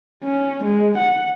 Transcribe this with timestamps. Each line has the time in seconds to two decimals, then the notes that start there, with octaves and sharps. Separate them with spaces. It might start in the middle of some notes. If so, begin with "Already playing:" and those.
0.24 C#4
0.64 G#3
0.98 F#5